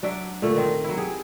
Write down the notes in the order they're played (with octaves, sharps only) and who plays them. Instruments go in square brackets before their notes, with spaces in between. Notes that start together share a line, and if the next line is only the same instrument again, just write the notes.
[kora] F#3 D4 D5 E5
A#2 D3 A3
D#3 C4 D#5
F#3 E4
G4 G#4